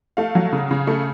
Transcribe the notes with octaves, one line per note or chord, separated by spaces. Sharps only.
A3 F5
F#3
C#3
C#3
A3